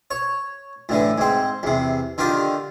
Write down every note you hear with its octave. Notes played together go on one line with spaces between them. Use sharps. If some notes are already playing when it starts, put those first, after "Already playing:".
C#5
A2 D3 E3
G#2 C4
E2 C3
D3 D#3 F4 G4